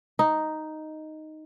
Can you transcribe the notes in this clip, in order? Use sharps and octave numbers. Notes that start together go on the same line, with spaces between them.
D#4